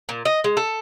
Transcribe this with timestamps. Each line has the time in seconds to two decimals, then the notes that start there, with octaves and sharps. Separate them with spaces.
0.09 A#2
0.25 D#5
0.44 G#3
0.57 A4